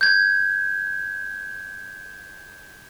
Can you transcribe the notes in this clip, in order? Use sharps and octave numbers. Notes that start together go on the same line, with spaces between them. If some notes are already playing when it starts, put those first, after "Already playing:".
G6 G#6